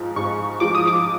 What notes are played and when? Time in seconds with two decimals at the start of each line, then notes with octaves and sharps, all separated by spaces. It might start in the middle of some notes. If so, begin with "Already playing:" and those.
Already playing: G#2 F3
0.16 G#2 C#6
0.60 F3 G#3 D6
0.75 D#6
0.87 D6